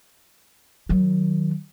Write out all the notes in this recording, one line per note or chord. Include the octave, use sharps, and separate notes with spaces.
D#3 F#3